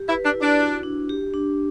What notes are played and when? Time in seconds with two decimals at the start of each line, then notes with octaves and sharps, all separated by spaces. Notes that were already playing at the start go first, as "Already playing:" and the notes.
Already playing: G4
0.08 E4 B4
0.24 D4
0.34 E4
0.42 D4
0.59 F#4
0.83 D4
1.09 G4
1.34 D4